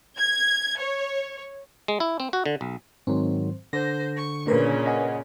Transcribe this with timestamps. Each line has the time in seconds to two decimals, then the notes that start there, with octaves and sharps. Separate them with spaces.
0.18 G#6
0.78 C#5
1.88 G#3
2.00 E4
2.20 C4
2.33 F#4
2.46 D3
2.61 B1
3.07 G#2 D#3 F#3 C4
3.73 D3 C5 A#6
4.17 C#6
4.47 A#2 C#3 C#4 D4 A#4 B4
4.86 D#5 F#5 G#5